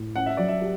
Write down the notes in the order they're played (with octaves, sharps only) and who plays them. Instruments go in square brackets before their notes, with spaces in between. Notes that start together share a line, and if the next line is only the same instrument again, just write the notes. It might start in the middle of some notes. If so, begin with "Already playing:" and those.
Already playing: [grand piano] A2
[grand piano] C#4 [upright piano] F#5
[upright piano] E5
[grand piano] F#3 [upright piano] D5
[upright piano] E5
[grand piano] G4